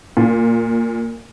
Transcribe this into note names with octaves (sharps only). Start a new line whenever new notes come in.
A#2